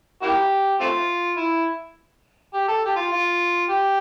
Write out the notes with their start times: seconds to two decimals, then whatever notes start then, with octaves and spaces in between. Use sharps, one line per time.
0.22 A#3 E4 G4
0.80 A3 C4 F4
1.37 E4
2.54 G4
2.68 A4
2.85 G4
2.96 F4
3.11 F4
3.69 G4